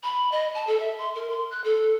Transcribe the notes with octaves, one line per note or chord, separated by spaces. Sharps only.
B5
D#5
A5
A4
E5
C6
A#4
C6
F#6
A4